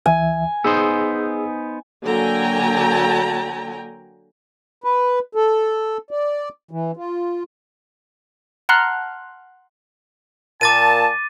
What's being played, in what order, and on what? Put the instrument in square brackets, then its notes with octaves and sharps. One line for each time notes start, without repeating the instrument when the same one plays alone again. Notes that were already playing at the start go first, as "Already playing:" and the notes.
[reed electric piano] C#2 E3 E5 [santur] G#5
[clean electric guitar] B3 D#4 C5 [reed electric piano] G#4 E6
[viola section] D3 F#3 A#3 G5 G#5 A#5
[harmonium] B4
A4
D5
E3
F4
[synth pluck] F#5 A5 A#5 C6 F6 F#6
[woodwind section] A#2 A5 [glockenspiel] D6 A6 D#7